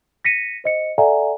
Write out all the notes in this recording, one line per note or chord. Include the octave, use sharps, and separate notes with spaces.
A#6 B6 C#7 D#7
C5 D#5 C#7
A4 D5 E5 F#5 G#5 A#5